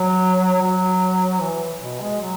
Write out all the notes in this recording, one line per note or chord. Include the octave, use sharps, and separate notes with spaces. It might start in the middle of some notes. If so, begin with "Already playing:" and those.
Already playing: F#3
F#3
E3
B2
G#3
F#3